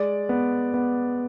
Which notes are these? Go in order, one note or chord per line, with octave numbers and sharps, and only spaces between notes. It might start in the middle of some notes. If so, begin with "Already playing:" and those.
Already playing: G#3 D5
B3
B3